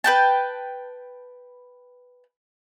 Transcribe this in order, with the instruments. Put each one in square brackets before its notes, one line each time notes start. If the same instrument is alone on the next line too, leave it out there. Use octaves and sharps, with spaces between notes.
[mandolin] B4 G5 A5